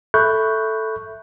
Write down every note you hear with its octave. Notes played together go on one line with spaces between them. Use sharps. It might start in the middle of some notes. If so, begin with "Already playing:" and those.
A4 E5 B5 C#6 F#6 G6